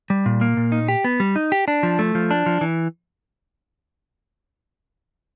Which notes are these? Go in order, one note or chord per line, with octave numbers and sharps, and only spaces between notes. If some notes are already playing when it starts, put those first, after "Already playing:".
G3
A#2
A#3
A#2
D#4
G4
B3
G3
D#4
G4
D4
F3
A3
F3
D4
F3
E3